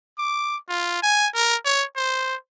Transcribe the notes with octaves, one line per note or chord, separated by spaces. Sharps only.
D6
F4
G#5
A#4
C#5
C5